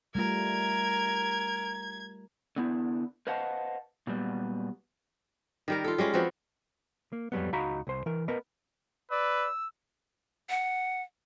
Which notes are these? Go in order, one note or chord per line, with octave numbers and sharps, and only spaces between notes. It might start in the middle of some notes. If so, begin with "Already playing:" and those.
G3 A3 F4 A#4 G#6
D3 B3 E4
B4 C5 D#5 F5 F#5 A5
A#2 F#3 G3 B3
D#3 G3 A#4
F4 A4
G3 G#3 C#4 F4
F3 B3 C4 F#4
A#3
F2 F#3 G3 B3
C#2 D#4 F#4 F5 A#5 B5
C2 C5
E3 A#4
B3 A#4 B4 D#5
B4 D5 E6
F#5